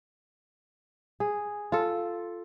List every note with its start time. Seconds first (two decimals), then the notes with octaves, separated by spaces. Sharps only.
1.20 G#4
1.72 F4 A4